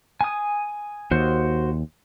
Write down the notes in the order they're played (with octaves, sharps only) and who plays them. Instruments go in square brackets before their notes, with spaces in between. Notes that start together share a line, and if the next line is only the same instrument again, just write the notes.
[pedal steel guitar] G#5 D#6
[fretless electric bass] D#2 [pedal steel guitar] F#4 C5